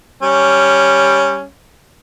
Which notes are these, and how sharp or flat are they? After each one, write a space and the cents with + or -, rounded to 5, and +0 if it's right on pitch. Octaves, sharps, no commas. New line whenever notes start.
G3 +0 C#4 +0